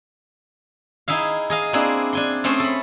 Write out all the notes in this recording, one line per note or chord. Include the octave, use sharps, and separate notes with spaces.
D#4 E4 G#4 E5 F5
G#4 D#5 F5
A#3 C4 D4 E4 G#4
D4 G#5 C6
A3 C4 C#4 G#4 C5
A4 B5